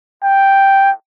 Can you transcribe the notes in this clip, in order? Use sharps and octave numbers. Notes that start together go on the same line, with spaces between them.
G5